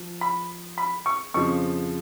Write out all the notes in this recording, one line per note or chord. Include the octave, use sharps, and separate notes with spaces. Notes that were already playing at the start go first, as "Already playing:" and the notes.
Already playing: F3
B5
B5
C#6
F2 C#3 F3 C#6